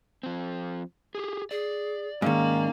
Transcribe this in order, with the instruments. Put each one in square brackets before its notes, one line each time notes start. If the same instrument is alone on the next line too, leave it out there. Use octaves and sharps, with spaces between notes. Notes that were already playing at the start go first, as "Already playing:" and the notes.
[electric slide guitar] F3 C4
G4 G#4
[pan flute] G#4 [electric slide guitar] D5
[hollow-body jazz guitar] G#2 D#3 [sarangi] A#3 [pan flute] C#4